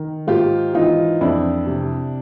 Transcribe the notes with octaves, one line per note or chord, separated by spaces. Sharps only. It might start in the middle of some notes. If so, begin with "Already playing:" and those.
Already playing: D#3
G#2 F4 G4
E3 D#4 F4
F2 D4 E4
C3